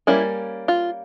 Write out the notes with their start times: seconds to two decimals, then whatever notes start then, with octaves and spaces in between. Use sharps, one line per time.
0.07 G3 A#3 C#4 E4
0.68 F4